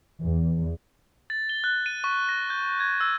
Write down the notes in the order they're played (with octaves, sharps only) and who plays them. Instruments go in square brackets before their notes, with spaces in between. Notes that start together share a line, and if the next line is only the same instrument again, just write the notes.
[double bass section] E2
[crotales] A6
G7
F#6
D#7
C#6
A#6
G6
G#6
E6